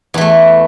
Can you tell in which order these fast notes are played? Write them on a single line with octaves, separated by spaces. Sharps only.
E2 E3 A3